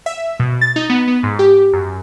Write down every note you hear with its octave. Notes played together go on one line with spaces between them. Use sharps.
E5
B2
A6
D#4
B3
B3
G#2
G4
F#2